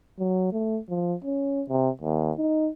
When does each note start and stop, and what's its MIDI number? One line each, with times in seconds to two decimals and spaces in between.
0.19 0.51 54
0.53 0.80 57
0.89 1.14 53
1.24 1.63 61
1.69 1.90 48
2.01 2.32 39
2.37 2.70 63